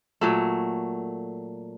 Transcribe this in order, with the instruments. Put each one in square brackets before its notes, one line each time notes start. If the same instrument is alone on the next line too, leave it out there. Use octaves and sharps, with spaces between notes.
[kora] A#2 F#3 A3